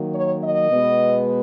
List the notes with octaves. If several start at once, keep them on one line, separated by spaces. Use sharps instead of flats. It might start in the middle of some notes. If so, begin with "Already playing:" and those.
Already playing: D#3 F#3 A#3
C#5
D#5
B2 G#3 B3